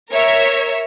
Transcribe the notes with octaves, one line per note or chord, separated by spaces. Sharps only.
A#4 C#5 E5